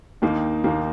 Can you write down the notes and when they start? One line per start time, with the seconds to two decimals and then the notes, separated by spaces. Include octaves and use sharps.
0.22 D#2 D#3 A#3 D#4
0.64 D#2 D#3 A#3 D#4